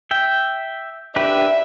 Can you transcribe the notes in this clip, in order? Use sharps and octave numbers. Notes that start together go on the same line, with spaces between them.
E5 G5
D4 G4 B4 E5